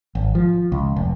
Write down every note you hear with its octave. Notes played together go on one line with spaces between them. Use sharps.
G#1
F3
C#2
F1